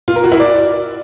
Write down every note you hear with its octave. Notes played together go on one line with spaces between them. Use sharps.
F4
A#4
F#4
E4
D5